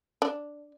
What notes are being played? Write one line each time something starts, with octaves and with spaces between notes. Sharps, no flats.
D4